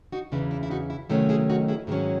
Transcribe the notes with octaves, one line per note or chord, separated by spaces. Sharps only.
D#4 F#4
E2 C#3 E3 E4
E4
E4
D#4 F#4
E4
C3 D#3 F#3 A3 C#4 E4
E4 G#4
D#4 F#4
E4 G#4
G#2 D#3 F#3 C#4 E4 G#4